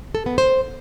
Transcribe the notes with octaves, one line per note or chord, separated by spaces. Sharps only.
A4
B3
C5